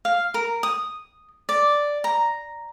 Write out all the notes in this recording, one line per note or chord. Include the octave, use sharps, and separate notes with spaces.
F5
A#4
D#6
D5
A#5